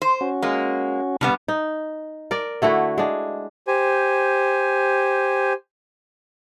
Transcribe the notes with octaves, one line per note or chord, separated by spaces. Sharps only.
C5
C#4 F#4
G#3 A#3
G2 C3 G3 B3
D#4
A#4 D5
D3 A3 E4 F#4
G#3 D4
G4 C5 G#5